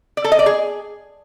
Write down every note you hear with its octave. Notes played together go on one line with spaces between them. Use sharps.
D5
A4
D#5
D5
G#4